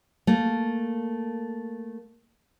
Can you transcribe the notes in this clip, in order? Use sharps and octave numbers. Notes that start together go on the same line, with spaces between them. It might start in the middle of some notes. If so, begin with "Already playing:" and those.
A3 A#3